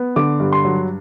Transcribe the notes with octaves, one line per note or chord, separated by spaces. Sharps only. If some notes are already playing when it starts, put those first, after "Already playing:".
Already playing: B3
D3 D6
G2
C6
F#3